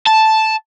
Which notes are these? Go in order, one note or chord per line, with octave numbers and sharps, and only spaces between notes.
A5